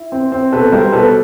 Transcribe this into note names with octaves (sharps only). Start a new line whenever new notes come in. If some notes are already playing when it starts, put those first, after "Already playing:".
Already playing: E4
C4
C4
B2 A4 B4
G3 A#4 C5
B2 A4 B4